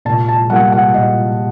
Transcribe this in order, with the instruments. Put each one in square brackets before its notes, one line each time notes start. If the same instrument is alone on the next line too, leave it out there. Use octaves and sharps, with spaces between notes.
[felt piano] A#2 A5
A5
G3 A#3 F#5
F#5
A#2 D#5